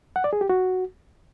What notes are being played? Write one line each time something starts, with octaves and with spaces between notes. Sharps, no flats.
F#5
D5
G#4
G4
F#4